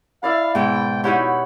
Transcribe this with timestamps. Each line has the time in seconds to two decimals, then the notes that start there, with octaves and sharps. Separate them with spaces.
0.23 E4 D5 F5 B5
0.55 G#2 B2 G5
1.04 D#4 E4 F#4 G4 C#5 F#5 B5